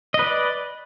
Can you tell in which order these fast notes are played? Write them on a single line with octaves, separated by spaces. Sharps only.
D#5 B4 D5